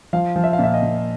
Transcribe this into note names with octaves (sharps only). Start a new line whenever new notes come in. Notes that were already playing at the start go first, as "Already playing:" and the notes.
F3 F5
F3
E5
F5
A#2 E5
D#5
A#2